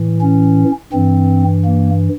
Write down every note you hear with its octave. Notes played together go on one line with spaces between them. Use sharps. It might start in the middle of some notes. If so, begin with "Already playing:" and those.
Already playing: A2 E3
C#4
G2 E3 C4
A#3